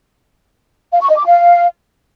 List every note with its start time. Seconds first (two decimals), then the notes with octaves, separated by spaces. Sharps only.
0.93 F5
1.01 C#6
1.09 D#5
1.17 D6
1.26 F5